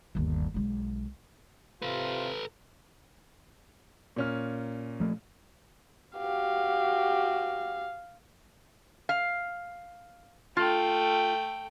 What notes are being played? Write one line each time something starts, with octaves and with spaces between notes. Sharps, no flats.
G1 D#2
B1 G#3
C3 F4 A4 B4
A#2 C#4 F6
F3 A3
F#4 G4 F5
F5
A3 F4 G5